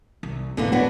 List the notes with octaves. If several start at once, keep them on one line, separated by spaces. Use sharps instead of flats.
C2
A#1 E2 D3 E3 A#3
F#3 B3 D4